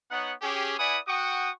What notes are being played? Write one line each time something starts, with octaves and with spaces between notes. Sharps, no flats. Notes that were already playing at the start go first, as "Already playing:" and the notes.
B3 D#4 C#5 F#5
C#4 G4 G#4
E4 B4 D5 F#5 G#5 D#6
F#4 F#5 G5 C#6 D#6